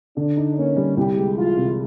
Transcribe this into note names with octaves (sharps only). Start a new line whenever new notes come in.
D3 D4
D#4
A#3 C#4
G3
C2 G4
G#3
E3 F4
C3